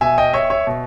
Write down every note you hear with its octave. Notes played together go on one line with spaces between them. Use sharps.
B2 E5 G#5
D#5 G5
C#5 E5
C#5 E5
B2